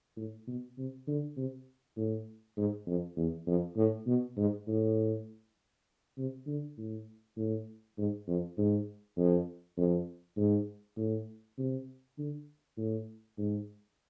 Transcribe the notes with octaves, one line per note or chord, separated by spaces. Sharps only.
A2
B2
C3
D3
C3
A2
G#2
F2
E2
F2
A2
B2
G#2
A2
C3
D3
A2
A2
G#2
F2
G#2
F2
F2
G#2
A2
C3
D3
A2
G#2